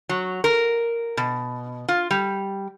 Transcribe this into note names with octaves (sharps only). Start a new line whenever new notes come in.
F#3
A#4
B2
F4
G3